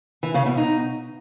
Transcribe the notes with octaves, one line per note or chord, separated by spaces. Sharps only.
E3
C#3
B2
D#4